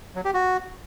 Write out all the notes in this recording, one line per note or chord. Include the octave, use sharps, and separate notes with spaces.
F#3
G4
F#4